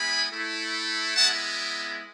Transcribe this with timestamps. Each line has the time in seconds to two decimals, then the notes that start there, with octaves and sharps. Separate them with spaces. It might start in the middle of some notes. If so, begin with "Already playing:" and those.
Already playing: G#3 B3 E4 G#5 B5
0.31 A3 E4
1.16 G#3 B3 E4 F#5 A5